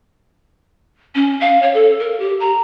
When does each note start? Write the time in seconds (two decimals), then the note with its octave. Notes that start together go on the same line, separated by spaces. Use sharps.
1.15 C#4
1.41 F5
1.62 C#5
1.74 A4
2.00 A#4
2.20 G4
2.40 A#5